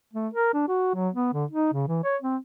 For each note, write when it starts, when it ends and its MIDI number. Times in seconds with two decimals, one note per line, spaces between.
0.13 0.28 57
0.34 0.51 70
0.53 0.65 62
0.68 0.93 66
0.94 1.09 54
1.14 1.30 59
1.33 1.45 50
1.51 1.73 63
1.73 1.87 49
1.88 2.02 52
2.04 2.17 73
2.22 2.37 60